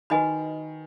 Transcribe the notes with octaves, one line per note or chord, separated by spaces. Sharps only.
D#3 F#4 B4 D#5 G#5 B5